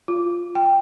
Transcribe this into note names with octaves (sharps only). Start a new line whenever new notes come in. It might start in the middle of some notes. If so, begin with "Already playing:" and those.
F4
G5